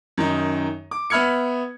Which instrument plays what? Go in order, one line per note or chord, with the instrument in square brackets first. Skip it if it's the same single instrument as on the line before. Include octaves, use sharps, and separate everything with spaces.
[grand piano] F#2 D#3 D#4
D6
B3 E5 B5 F6 G#6 C#7